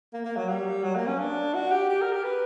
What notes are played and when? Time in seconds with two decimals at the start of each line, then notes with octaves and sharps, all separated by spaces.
0.13 A#3
0.25 A#3
0.37 F#3
0.49 G3
0.84 F#3
0.96 A#3
1.07 C#4
1.19 D4
1.54 F#4
1.72 G4
1.89 G4
2.01 A#4
2.12 G4
2.24 B4